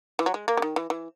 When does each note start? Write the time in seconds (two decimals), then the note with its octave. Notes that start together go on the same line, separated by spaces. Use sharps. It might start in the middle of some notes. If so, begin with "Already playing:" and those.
0.19 E3
0.26 F#3
0.34 G#3
0.48 A#3
0.57 C#3
0.62 D#3
0.76 E3
0.90 E3